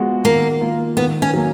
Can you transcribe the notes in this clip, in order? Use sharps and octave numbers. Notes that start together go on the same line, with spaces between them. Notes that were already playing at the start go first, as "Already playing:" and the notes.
Already playing: F3 G#3 B3 F#4
D#3 A#3
A#3 F4
D#3 B3
C#4
F#3 A#3